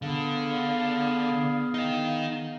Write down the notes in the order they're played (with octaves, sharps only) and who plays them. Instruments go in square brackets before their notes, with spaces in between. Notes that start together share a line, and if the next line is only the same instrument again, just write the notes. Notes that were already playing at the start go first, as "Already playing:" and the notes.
[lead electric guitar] D3 [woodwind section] B3 G#4 F5
[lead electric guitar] D#3 D#4